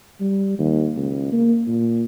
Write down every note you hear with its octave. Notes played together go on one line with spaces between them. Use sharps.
G3
D#2
C#2
A#3
A#2